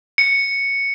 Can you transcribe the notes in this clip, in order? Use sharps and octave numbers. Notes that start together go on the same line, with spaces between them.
C#7